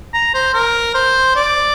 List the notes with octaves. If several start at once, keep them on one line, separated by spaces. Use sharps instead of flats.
A#5
C5
A#4
C5
D5